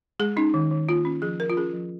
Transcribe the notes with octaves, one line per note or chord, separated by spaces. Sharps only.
G#3 G#4
C#4 D#4
D#3
D#3
A#3 F4
C#4
F3 G#4
F3 A#4
F4
C#4 G#4
F3